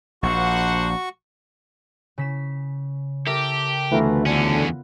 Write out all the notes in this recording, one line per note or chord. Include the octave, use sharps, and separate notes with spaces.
A#1 D4 F#4 C5 F#5 C#6
C#3 B6 E7
G4 A4 A#4 E5
D2 E3 A3 B3 F4 A#5
E2 D3 C#4